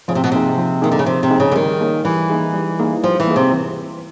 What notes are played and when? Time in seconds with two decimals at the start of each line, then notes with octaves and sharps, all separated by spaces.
0.08 C#3 F3
0.15 C3
0.24 B2
0.32 C3 A#3 D#4 G#4
0.57 F3
0.82 D#3 A#3 D#4 G#4
0.92 D3
0.99 C#3
1.06 C3 F3
1.23 C3
1.30 A#3 D#4 G#4
1.40 C#3
1.51 D3
1.55 D#3 G3
1.80 A#3 D#4 G#4
2.04 E3 G3
2.30 A#3 D#4 G#4
2.54 G3
2.79 A#3 D#4 G#4
3.03 F3 G3
3.20 E3
3.27 A#3 D#4 G#4
3.36 C3
3.52 E3